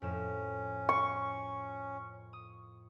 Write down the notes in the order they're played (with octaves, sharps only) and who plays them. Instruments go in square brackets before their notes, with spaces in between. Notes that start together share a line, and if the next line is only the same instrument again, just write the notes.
[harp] F2 A2 E7 [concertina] C#4
[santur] C#6
[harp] D#6